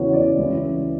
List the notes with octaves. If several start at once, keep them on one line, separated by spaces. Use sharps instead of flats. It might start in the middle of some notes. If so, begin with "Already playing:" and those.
Already playing: E2 C#3 E3 F#4 C#5
D5
C#2 C#3 E3